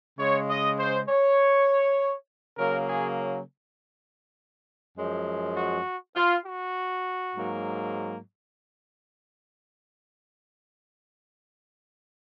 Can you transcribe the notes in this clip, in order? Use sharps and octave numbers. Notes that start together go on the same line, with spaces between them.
C#3 G#3 C#5
D#5
C5
C#5
C#3 F#3 A#3 A#4
G#4
F#2 F3 G#3
F#4
F4
F#4
G#2 F#3 A#3